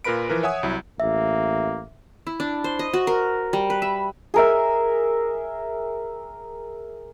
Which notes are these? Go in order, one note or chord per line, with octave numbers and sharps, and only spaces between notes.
A#2 F4 A#4 B4 B5 D7
E3 F3 A#4 B4
C#5 E5 F#5 G#5 D#6
C2 F#3 E4
A1 A#3 E5
E4
D4
C5
D#5
F#4
A#4
G3
B4
E5
G#4 A#4 E5